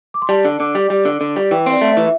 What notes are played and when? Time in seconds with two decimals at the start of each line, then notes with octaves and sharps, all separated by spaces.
0.14 D6
0.22 C6
0.29 G3 A5
0.45 D3
0.60 D3 D6
0.75 G3
0.90 G3
1.05 D3
1.21 D3
1.36 G3
1.51 E3 G5
1.66 C4
1.72 D5
1.81 A3
1.92 E5
1.97 E3